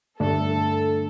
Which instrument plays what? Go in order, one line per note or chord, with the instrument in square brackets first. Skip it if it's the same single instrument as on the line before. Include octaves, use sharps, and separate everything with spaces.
[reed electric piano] G2 D3 A3 D4 [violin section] A4